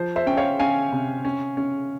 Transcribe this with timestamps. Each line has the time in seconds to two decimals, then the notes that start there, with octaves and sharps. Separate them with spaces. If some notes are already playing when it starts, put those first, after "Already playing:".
Already playing: F3 C5
0.16 C5 E5
0.27 C#4 G5
0.37 C#5 F5
0.59 C#4 F5 G#5
0.92 C3
1.25 C#4
1.57 C#4